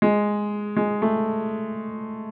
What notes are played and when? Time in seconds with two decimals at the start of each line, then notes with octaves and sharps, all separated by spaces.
0.02 G#3
0.77 G#3
1.02 A3